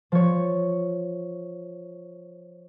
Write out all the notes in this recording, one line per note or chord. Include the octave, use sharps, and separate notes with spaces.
F3 C#5